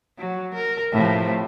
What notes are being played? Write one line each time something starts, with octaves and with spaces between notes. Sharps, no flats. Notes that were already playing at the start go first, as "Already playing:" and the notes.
F#3
A#4
A2 C3 F3